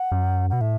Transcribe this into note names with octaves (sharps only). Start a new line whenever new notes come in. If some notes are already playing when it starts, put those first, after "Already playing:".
Already playing: F#5
F#2
B2 F#5
A2 E5